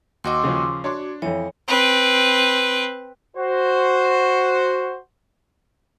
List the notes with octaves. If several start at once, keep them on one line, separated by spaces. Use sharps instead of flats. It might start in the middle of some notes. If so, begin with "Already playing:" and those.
D#2 F#4 D#5 C6 D6 E6
C#3 F3
D4 F#4 C#5 C6 D6
F2 E3 C#5
C4 B4
F#4 C5